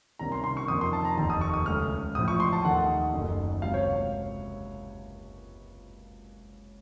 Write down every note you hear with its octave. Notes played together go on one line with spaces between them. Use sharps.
C2 C3 D#3 A#3 C#4 A#5
C6
C6
C#6
F2 D#3 A#3 D#6
C6
A5
A#5
F1 D#2 D#3 A5
D#6
C#6
D#6
C#2 C#3 A3 C#4 F6
A1 A2 F3 A3 D#6
C#6
C6
A5
D#2 D#3 A3 F#5
F#1 F#2 D#3 A3
C#2 C3 F#3 F5
C#5